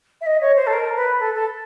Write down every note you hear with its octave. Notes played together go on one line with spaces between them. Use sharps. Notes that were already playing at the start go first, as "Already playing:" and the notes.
E5
D#5
C#5
C5
A4
A#4
B4
A4
A4